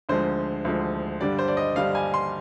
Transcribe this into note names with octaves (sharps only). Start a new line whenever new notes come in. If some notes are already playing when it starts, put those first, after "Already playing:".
D2 D3 F3 G#3 C5
D2 D3 F3 G#3
G2 D3 G3 D4 D5
C5
D5
D#5
G2 D3 G3 D4 F5
G#5
C6